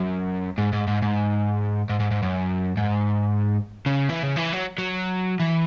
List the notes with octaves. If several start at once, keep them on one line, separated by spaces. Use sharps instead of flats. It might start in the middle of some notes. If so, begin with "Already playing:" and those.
Already playing: F#2
G#2
G#2
G#2
G#2
G#2
G#2
G#2
F#2
G#2
C#3
E3
C#3
E3
F#3
F#3
E3